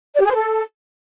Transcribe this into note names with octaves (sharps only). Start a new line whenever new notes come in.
D5
G4
G#4
C5
A4